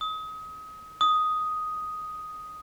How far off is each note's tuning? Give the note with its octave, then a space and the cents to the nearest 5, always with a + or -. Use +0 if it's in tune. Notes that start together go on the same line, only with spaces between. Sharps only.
D#6 +30
D#6 +5